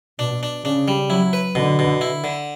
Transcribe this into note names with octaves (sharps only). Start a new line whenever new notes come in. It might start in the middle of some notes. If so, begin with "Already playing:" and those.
B2 D4
D4
C#3 D4
G3
F#3 E4
B4
B2 D3
B2
E4
D3